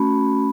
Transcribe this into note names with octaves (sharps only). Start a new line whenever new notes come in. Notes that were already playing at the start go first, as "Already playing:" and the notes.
Already playing: A3 C#4 F#4 B5